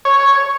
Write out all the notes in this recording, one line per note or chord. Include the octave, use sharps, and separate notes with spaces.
C#5